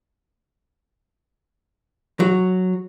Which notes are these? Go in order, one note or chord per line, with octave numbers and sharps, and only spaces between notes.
F#3